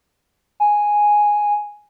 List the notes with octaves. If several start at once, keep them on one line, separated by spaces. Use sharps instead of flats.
G#5